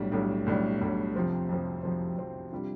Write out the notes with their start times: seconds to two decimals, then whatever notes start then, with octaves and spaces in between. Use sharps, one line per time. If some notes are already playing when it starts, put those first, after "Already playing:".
Already playing: B1 A2 G3 D4
0.12 B1 A2 G3 D4
0.46 B1 A2 G3 D4
0.81 B1 A2 G3 D4
1.16 F2 C3 F3 C4
1.49 F2 C3 F3 C4
1.83 F2 C3 F3 C4
2.17 F2 C3 F3 C4
2.52 C3 G3 D4 F4